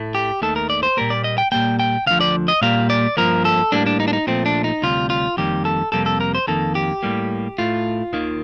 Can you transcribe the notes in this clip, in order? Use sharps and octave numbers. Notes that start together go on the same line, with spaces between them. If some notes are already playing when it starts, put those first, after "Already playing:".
Already playing: A2 A3
G4
D#2 D#3 A3 A4
A#4
D5
C5
A#2 G3 A#3 A#4
D5
D#5
G5
A#2 G3 A#3 G5
G5
D2 D3 F3 F5
D5
D#5
A#2 G3 A#3 F5
D5
G2 F3 A#3 A#4
A4
A2 G3 A#3 D4
D4
D#4
D4
D#4
A#2 F3 A3 C4
D4
D#4
D2 C3 G3 F4
F4
F2 D#3 G3 A#3 G4
A4
F2 C3 G3 A#3 A4
A4
A#4
C5
F2 D#3 A#3 A4
G4
A2 G3 A#3
A2 A3 F4
D#2 D#3 A#3